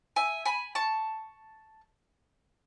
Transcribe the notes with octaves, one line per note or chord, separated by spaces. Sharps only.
E5 G#5
G#5 B5
A5 C#6